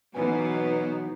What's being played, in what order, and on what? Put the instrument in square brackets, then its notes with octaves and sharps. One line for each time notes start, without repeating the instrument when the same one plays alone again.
[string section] B2 [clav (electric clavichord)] E3 C#4 G#5 [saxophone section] F#3 B3 [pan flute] D#4